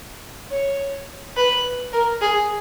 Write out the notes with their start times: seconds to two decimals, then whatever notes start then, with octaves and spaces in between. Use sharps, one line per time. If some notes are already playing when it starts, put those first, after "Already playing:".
0.50 C#5
1.36 B4
1.93 A#4
2.21 G#4